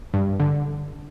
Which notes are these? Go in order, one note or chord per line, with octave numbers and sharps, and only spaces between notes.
G2
D3